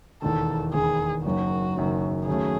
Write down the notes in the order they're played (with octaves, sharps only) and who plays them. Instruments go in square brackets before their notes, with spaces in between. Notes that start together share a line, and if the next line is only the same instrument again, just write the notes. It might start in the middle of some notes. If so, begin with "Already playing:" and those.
[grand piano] E1 D#2 D#3 [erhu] A4
[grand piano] E1 D#2 D#3 [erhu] G#4
[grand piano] F#1 F#2 D#3 F#3 [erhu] F#4
[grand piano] F#1 F#2 D#3 F#3
[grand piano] D#2 C#3 F#3 A3 C#4 [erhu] G#4